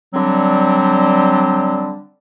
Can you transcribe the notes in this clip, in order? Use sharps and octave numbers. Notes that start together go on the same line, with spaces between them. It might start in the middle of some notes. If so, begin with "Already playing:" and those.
D3 F#3 G3 C4